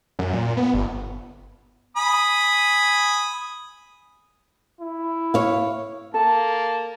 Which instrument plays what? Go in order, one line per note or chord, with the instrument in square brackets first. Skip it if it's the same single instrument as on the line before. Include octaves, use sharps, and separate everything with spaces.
[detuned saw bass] F#2
A#2
B3
G1
[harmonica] G#5 B5 D#6
[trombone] E4
[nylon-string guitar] C#5 F5
[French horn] A#3 [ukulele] A4 [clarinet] A5